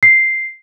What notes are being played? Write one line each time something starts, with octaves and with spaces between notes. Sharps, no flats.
C7